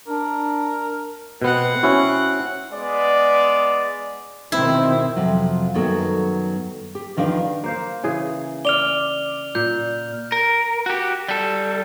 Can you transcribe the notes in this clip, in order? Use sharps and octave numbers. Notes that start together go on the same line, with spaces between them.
D4 A#4
B2 B3 C4 F#5
C#4 E4 F#4
G#3 B3 D5
B2 D#3 C4 E4
F2 C3 F3 F#3
F#2 D#3 F#3 B3 A4
G4
E2 D#3 F3 D4 F5
A#3 C5 F5
C#3 E3 G#4
D5 F6 F7 G7
A#2 G6
A#4
F#4 G4
G3 A4